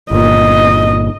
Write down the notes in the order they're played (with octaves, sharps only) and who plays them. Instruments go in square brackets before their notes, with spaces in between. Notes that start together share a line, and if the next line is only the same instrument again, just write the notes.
[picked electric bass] G1 A#2 [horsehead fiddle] D#5